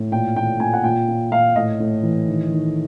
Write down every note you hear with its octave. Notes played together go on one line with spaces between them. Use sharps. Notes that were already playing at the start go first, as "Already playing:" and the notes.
Already playing: A2
A#2 G5
A#2 G5
A#2 G#5
F#5
A#2 G5
A#2
A#2 F5
A2 D#5
A2
E3
D#3
D#3